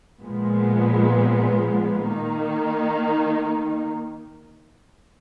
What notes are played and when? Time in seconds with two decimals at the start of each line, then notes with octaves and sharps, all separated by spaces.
0.22 A#2 F3 G#3 B3
2.05 D#3 A#3 D#4